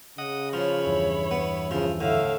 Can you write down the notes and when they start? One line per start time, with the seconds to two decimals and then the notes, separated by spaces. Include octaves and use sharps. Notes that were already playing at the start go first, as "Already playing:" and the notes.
0.18 C#3 D#5 F#5 D#6
0.53 F3 F4 C#5 B5
0.85 E2 G2 E3
1.31 B3
1.71 C#3 F3
2.00 A2 D3 E5 F5